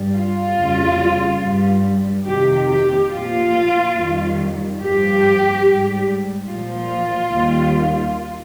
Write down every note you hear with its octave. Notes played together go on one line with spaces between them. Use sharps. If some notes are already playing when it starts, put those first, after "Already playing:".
Already playing: G2 G3
F4
F2 C#3 G3
G2 G3
F2 C3 D#3 G4
G4
A#2 F3 F4
F2 D#3 G3
G2 F3 G4
G#2 G3
A#2 F3 F4
D#2 D#3 G3